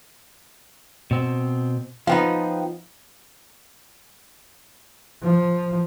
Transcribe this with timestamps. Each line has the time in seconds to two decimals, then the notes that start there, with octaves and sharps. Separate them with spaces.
1.11 B2 C4
2.07 F3 B3 D#4 F5 G5 B5
5.22 F3